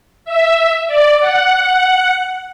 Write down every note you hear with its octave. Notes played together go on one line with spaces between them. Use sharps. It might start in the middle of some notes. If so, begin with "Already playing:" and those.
E5
D5
F#5